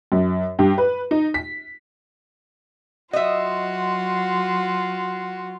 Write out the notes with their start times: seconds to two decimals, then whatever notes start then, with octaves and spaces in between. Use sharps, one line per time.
0.12 F#2
0.59 G2
0.78 B4
1.11 D#4
1.34 B6
3.13 F#3 F4 F#4 D#5 E5 C6